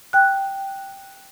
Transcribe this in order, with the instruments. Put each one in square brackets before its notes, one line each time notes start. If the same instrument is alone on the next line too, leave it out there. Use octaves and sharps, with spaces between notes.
[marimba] G5 F#6